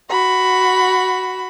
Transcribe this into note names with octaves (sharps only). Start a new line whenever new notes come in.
F#4 B5